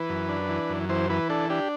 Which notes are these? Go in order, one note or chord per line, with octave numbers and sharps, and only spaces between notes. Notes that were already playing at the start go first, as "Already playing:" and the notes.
Already playing: E3 B4
F#2
D4
E3
F#2
E3 C5
E3 B4
D4 A4
D4 G4